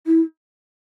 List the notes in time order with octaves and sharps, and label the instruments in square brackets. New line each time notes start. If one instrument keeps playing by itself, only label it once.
[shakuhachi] E4